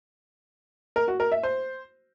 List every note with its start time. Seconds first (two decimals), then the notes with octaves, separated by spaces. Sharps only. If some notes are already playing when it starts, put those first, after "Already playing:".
0.96 A#4
1.08 F#4
1.20 A#4
1.32 E5
1.43 C5